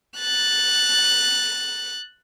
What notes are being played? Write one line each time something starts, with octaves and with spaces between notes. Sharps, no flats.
F#6 A6